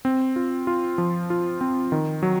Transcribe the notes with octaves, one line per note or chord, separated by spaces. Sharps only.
C4
F4
F4
F3
F4
C4
D#3
F#3